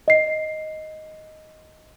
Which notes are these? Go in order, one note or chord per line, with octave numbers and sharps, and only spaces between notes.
D#5 C7